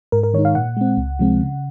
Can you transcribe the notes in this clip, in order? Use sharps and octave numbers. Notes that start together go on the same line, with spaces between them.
G#2 A#4
A#4
D#3 G#3 D#4 C#5
F5
A#2 F#5
G#3 C4
C#2
C3 F3 G#3 C4
C#3